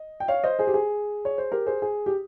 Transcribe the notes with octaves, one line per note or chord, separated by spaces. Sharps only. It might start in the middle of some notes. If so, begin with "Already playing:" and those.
Already playing: D#5
G5
C#5 F5
C5 D#5
G#4 C5
G4
G#4
C#5
C5
G4 A#4
G#4 C5
G#4
G4